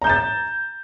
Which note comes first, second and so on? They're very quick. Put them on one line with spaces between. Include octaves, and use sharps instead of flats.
A#5 G6 E7 A6